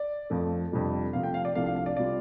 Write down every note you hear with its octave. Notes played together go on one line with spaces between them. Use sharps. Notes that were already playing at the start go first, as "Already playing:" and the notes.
Already playing: D5
F2 F3 A3
F2 C3 G3 D4 F4
C3 F3 A3 F5
G5
F5
D5
C2 C3 F3 A3 D4 F5
F5
F5
D5
C3 G3 F4 D5